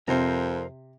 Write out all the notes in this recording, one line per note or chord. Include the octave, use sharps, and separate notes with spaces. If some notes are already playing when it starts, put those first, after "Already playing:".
F2 C3 A#4 C5